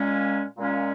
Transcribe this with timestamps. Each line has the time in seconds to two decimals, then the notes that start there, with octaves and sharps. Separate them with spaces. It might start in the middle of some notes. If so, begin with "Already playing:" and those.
Already playing: A#2 G#3 C#4
0.57 A#2 G#3 C#4